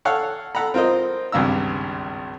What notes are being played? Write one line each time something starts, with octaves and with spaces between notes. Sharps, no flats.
A4 C#5 F5 F#5
A4 F#5 A#5 B5
C4 F4 A#4 C5 D#5
G#1 C#2 G2 F5 A#5 E6